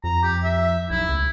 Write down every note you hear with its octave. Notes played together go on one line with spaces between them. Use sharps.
F2 A#5
G4
E5
B1 E4
C#2